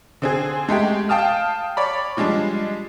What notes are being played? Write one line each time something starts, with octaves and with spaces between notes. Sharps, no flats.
D3 C4 G#4
G#3 A3 G4 G5
F5 G5 A5 D#6 F6
C#5 D5 B5
F3 G3 G#3 D4